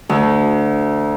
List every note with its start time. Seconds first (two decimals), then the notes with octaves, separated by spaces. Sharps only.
0.09 D2